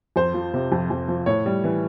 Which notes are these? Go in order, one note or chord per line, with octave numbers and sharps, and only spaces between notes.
F2 C5
F3
C3
F2
F2
F3
A2 C#5
G3
E3